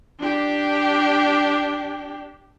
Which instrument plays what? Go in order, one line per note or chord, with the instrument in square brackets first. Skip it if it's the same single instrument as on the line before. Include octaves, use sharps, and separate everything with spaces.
[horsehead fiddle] D4 G4